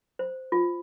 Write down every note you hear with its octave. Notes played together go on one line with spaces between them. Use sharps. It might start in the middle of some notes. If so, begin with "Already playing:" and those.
C5
F4